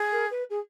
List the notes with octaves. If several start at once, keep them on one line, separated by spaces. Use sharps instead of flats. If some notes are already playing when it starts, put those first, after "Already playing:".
Already playing: G#4
A#4
B4
G#4